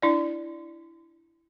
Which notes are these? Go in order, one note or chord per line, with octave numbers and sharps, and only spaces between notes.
D4 E4 D5